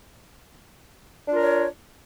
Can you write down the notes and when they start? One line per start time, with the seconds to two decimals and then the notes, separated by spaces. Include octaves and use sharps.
1.26 D4
1.31 F4
1.35 A#4
1.40 C#5